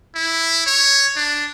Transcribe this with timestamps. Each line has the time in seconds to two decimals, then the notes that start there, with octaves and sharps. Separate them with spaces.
0.15 E4
0.66 C#5
1.16 D4